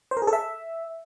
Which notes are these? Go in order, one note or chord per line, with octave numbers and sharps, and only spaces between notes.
C5
A#4
G#4
A4
E5